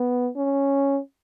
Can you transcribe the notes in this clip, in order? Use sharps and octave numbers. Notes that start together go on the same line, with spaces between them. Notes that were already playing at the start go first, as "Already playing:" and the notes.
Already playing: B3
C#4